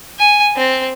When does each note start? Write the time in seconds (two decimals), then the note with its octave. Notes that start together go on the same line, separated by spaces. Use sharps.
0.19 G#5
0.56 C4